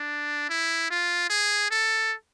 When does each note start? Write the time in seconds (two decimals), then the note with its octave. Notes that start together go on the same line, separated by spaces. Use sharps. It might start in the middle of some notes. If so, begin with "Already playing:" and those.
Already playing: D4
0.50 E4
0.91 F4
1.30 G#4
1.71 A4